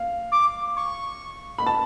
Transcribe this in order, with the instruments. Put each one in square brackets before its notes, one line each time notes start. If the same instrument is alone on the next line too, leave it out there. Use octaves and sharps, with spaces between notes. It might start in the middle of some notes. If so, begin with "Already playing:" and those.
Already playing: [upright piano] F5
[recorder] D6
C#6
[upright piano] B5
A5